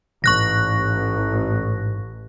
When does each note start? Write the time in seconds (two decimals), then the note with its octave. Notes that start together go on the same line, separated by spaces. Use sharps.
0.24 A1 G#2 C#6 F#6 A#6